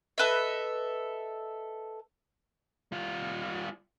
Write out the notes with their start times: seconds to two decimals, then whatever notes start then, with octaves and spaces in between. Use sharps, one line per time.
0.18 A4 B4 D#5 E5
2.92 G3 F4